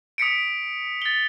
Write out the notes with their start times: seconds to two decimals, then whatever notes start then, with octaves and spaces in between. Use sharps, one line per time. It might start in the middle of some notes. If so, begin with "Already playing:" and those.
0.18 D#6 B6 C#7 D7
1.02 A6 G7